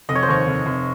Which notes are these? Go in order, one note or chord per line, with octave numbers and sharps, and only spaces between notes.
F1 D#5
C#5
C5
D#2 C#5
F1
F1